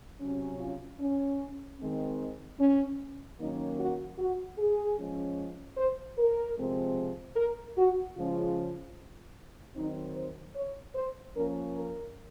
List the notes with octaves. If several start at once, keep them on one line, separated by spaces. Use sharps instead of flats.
C3 F#3 C#4
F4
C#4
D#3 G#3 C4
C#4
D#3 F#3 A#3 C#4 D#4
F#4
F#4
G#4
F3 G#3 C#4
C5
A#4
C3 F3 G#3 C4
A#4
F#4
C#3 F3 G#3 C#4 F4
D#3 F#3 C4 D#4
C5
C#5
C5
F3 A#3 C#4 A#4
A#4